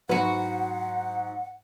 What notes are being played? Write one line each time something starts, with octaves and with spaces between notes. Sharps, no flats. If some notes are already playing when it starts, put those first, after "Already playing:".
G#2 F#3 F#4 B4 F#5